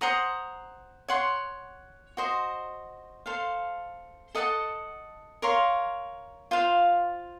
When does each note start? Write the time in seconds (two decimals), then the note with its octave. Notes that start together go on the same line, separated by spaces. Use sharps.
0.01 C5 F#5 A#5 D#6
1.08 C#5 F#5 C6
2.17 F#4 C5 D#5
3.26 A4 C5 F5
4.35 A4 D#5 F#5 A5
5.42 A#4 C#5 F5 C6
6.51 F4 C5 F5